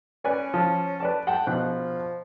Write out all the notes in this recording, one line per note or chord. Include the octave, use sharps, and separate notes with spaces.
C#4 B4 D5 G#5
F3
B4 D5 A5
F#5 G5 A5
A#1 B2 F3 F#6